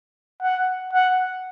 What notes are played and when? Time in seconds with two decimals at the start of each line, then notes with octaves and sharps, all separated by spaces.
0.43 F#5
0.93 F#5